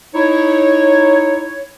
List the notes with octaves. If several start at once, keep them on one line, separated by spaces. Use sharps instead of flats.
D#4 E4 C#5